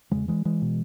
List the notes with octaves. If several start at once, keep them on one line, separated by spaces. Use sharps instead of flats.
E2 C#3 E3 G#3
E3 G#3
E3 G#3
B2